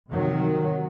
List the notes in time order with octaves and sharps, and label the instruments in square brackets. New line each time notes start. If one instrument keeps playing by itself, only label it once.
[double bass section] C3 D#3 F#3